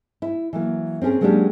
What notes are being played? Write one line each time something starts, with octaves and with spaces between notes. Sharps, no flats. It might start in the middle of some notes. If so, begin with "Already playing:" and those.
E4
E3 F#3 A#3
C4 C#4 G4 G#4 A#4
F#3 G#3 A#3 C#4 D4 G4